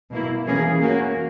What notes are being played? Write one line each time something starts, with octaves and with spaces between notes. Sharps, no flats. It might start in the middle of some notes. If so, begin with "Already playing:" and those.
B2 A#3 E4
E3 A#3 C#4 G#4
A#3 C#4 F#4